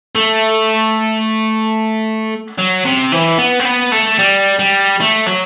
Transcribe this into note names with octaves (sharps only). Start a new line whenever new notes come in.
A3
F#3
C3
E3
B3
C4
B3
A3
G3
G3
A3
F#3